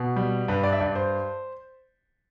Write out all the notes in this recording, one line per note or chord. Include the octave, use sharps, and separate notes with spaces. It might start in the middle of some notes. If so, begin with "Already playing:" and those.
Already playing: B2
G3
G2 B4
D5
E5
G2 D5
C5